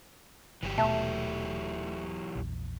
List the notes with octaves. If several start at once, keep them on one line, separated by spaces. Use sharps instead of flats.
G1 E3 F#3 G4
D#1 B2 A3 E5 A5
A#1 E2